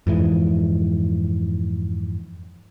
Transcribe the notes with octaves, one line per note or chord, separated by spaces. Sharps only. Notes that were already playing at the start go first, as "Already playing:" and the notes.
F2 G#2 E3